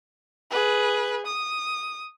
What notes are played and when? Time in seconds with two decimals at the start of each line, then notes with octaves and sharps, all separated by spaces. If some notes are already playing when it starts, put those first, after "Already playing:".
0.51 G#4 B4
1.26 D#6